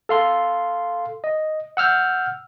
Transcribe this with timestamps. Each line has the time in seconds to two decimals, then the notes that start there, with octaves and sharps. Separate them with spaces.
0.09 A4 F5 C6
1.24 D#5
1.77 F#5 E6 F6 G6